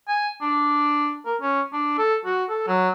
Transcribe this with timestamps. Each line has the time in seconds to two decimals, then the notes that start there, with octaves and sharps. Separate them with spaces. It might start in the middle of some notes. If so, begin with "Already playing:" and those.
0.08 G#5
0.42 D4
1.26 A#4
1.41 C#4
1.73 D4
1.98 A4
2.25 F#4
2.49 A4
2.67 F#3